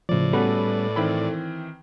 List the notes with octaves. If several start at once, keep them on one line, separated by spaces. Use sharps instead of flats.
A2 C#3 F3 D5
G3 B3 C#4 F#4 A4 B4
D#3 E3 C4 B5